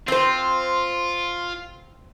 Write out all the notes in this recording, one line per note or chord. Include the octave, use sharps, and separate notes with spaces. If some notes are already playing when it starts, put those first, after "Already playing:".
C4 F4 C5